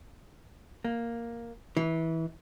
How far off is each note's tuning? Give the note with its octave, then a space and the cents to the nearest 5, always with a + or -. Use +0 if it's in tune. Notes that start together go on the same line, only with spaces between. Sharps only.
A#3 +0
E3 -20